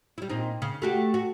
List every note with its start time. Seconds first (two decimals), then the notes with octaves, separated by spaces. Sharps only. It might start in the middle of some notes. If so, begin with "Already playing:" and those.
0.18 G3 E4
0.30 A#2 C4 D#4
0.62 C#3
0.82 A3 F#4 G4
1.14 F#4